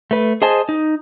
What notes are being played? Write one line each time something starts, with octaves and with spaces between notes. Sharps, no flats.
A3 B4
G#4 C5 D#5 G#5 A5
D#4